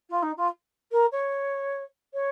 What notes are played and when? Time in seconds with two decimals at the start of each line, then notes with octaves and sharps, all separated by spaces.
0.10 F4
0.22 D#4
0.37 F4
0.92 A#4
1.12 C#5
2.13 C#5